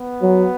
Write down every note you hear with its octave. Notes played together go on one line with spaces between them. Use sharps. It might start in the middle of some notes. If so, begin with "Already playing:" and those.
Already playing: B3
F#3